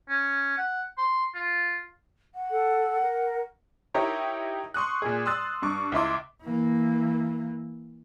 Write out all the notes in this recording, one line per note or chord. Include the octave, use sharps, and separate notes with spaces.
C#4
F#5
C6
F4
F#5
A4
A#4
D#4 E4 G4 A#4 C#5 A#5
C6 C#6 D#6 F#6
A#2 G#4
C6 D#6 E6 F#6 A6
G2 C#6 D6
C#2 E4 C6 D6
E3 A#3